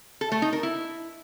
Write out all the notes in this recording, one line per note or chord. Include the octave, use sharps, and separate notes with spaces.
A4
A3
D#4
A#4
E4